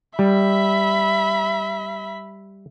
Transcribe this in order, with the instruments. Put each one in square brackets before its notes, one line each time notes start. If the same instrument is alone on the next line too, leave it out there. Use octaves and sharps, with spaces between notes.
[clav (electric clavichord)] G3 [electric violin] E5 B5